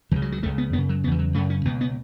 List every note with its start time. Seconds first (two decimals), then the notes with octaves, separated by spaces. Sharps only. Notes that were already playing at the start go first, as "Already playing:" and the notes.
0.11 C#2 C#3 E3
0.22 F#3
0.32 F#3
0.43 C#2 C#3 A3
0.58 B3
0.73 F#2 C#3 B3
0.89 F#3
1.04 C#3 B3
1.07 E2 E3
1.19 F#3
1.34 F#2 C#3 A3
1.50 C#4
1.65 C#2 B2 B3
1.81 B3